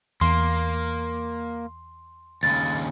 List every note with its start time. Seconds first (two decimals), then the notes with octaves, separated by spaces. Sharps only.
0.21 E2 A#3 C6
2.43 D#2 C#3 A6